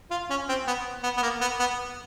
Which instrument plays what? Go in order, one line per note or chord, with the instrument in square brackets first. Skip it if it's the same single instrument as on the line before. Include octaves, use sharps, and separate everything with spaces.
[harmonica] F4
C#4
C4
B3
B3
B3
A#3
B3
B3